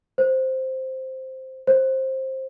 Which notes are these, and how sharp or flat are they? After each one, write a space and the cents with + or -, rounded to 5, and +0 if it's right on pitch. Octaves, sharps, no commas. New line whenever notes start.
C5 +0
C5 +15